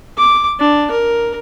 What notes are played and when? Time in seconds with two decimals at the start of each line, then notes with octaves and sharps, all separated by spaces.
0.17 D6
0.60 D4
0.91 A#4